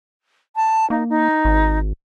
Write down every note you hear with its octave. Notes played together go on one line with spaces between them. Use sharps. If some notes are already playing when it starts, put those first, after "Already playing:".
A5
A#3 D#4
D#4
G#1